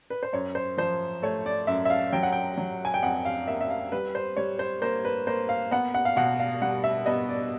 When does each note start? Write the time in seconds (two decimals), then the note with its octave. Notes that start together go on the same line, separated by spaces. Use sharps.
0.10 B4
0.23 C5
0.33 F#2 C#5
0.55 C5
0.78 F3 C5
1.22 A3 C#5
1.46 D5
1.67 F#2 E5
1.85 E5
1.90 F5
2.12 F#3 G5
2.23 F#5
2.32 G5
2.58 F#3
2.85 G#5
2.94 G5
3.03 F2 F#5
3.25 F5
3.47 A#3 E5
3.61 E5
3.70 F5
3.92 G3 B4
4.15 C5
4.37 G3 C#5
4.59 C5
4.82 A#3 C5
5.05 B4
5.27 A#3 C5
5.49 F5
5.71 B3 F#5
5.94 F#5
6.05 F5
6.17 B2 F#5
6.40 F5
6.62 G3 F#5
6.84 E5
7.06 B3 D#5
7.29 D5